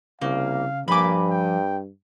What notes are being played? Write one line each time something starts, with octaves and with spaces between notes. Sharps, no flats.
C2 C#3 A#3 F5
G2 F3 A#3 G#5 B5 D6
G5